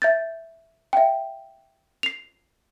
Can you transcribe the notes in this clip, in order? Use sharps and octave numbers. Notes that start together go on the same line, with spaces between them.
E5 G6 A6
E5 F5 G5
C7 F7